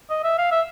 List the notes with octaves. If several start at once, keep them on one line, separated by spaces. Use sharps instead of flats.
D#5
E5
F5
E5